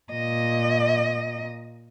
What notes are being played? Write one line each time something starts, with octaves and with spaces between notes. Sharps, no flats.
A#2 D#5